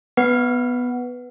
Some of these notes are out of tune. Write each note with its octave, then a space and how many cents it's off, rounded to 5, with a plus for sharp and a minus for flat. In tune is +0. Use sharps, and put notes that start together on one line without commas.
B3 +0 B4 +0 F#5 +0